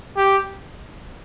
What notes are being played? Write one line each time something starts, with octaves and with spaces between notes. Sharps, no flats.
G4